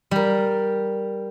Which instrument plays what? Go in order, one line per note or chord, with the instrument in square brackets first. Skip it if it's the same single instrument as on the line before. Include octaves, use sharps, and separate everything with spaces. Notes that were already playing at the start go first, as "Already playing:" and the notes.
[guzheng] G3 A#4